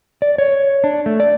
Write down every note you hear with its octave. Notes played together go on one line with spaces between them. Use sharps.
D5
C#5
D4
A3
D5